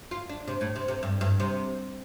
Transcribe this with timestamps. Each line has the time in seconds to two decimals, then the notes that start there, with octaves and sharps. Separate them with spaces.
0.11 F4
0.29 D4
0.48 C3
0.61 A2
0.76 C3
0.88 C3
1.03 G2
1.21 G2
1.40 C3